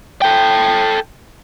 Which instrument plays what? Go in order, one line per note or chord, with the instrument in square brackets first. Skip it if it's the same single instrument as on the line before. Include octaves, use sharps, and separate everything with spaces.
[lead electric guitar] A4 G5